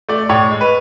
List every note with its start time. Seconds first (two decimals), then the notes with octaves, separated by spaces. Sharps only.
0.09 A3 D5
0.29 A2 C#5
0.51 G#3
0.61 B4